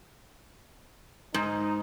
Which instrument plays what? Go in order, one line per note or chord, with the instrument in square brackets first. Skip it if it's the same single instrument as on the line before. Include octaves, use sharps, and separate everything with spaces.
[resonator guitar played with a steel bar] G#2 [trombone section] D#4